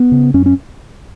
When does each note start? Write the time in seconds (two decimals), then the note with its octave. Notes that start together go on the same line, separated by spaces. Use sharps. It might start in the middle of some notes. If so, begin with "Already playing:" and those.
Already playing: B3
0.12 C#3
0.34 F#2 C#4
0.46 C#4